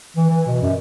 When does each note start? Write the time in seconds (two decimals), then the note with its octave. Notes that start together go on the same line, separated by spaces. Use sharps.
0.17 E3
0.30 E3
0.46 B2
0.62 F#2